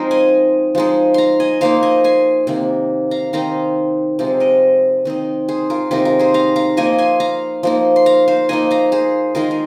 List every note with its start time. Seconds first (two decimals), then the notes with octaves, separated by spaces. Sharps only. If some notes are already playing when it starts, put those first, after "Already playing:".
Already playing: F3 G#3 C4 D#4 G#4 A#4 C5
0.11 D#5 G#5
0.75 F3 G#3 D#4
1.14 F5 A#5 C6
1.40 D#5 G#5
1.61 F3 A#3 D#4 C5 F5
1.83 D#5 G#5
2.04 G#5 C6
2.47 C3 D#3 A#3
3.11 F5 A#5
3.33 D#3 C4 D#4 F5 A#5
4.19 C3 F3 G#3 D#4
4.40 A#4 D#5
5.05 D#3 C4 D#4
5.49 G#4 C5
5.70 F4 A#4
5.91 C3 D#3 G#3 D#4 F4 A#4
6.05 F4 A#4
6.19 G#4 C5
6.34 F5 A#5
6.56 F5 A#5
6.77 F3 A#3 D#4 D#5 G#5
6.98 G#5 C6
7.20 F5 A#5
7.63 F3 A#3 D#4
7.96 C6
8.06 F5 A#5
8.28 C5 F5
8.49 F3 A#3 D#4 D#5 G#5
8.71 F5 A#5
8.92 G#4 C5
9.35 D#3 G#3 D#4 F4 A#4
9.51 A#4